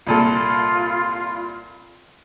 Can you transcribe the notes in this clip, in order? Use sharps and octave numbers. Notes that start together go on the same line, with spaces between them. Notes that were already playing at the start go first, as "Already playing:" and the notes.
C2 A#2 F4 A4